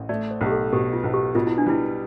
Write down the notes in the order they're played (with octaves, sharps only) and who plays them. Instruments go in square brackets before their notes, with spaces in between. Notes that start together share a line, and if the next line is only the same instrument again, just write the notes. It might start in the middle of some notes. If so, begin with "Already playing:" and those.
Already playing: [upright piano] A1
[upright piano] A3 [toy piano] D5
[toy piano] C5
[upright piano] B1
[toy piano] G4
A4
[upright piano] B2 [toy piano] G4
[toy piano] F4
[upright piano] B1
[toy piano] G4
[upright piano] B2 [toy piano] F4
[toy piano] E4
D4
[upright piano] G3 [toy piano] E4